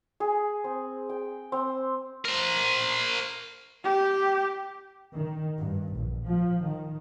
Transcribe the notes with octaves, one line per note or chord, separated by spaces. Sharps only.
G#4
C4
G5
C4
A#4 C5
G4
D#3
G2
A#1
F3
D#3